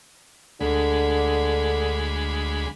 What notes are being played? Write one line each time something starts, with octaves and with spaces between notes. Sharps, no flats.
D2 D3 G#3 B5